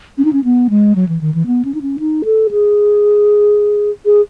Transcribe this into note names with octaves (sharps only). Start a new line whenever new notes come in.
C#4
D#4
C#4
B3
G#3
F#3
E3
D#3
E3
B3
C#4
D#4
C#4
D#4
A4
G#4
G#4